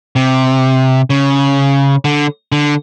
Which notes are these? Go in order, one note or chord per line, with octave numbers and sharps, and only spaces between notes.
C3
C#3
D3
D3